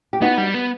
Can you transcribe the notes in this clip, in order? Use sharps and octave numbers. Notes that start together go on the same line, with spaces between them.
G4
B3 D#4 F#4
G3
B3